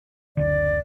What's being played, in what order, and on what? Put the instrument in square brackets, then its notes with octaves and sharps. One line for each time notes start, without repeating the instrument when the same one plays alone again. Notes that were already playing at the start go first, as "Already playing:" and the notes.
[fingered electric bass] F#1 D2 D3 [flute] D5